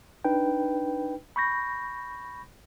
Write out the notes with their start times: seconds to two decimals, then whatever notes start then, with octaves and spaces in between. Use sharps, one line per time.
0.24 D4 D#4 B4 G5
1.36 B5 C#6 G6 A#6